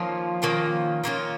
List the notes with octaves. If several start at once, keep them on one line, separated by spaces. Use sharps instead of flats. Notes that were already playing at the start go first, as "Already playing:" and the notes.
Already playing: D#3 F3 A#3 C#4 F4
D#3 A#3 C#4 F4
D#3 A#3 C#4 F4